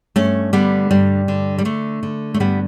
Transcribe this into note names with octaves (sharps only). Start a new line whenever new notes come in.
G2 A3 C#4
D3 G3 B3
G2 G3
D3
G3
D3 A3
D3
A3
G2 G3 B3